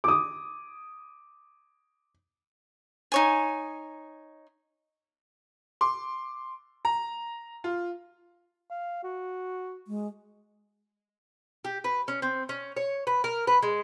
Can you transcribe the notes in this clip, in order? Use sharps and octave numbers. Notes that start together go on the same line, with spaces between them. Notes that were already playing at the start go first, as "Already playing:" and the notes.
D6 D#6
D#4 C#5 G#5
C6 D6
A#5
F4
F5
F#4
G#3
G4
B4
C#4
C4
C#4
C#5
B4
A#4
B4
G#3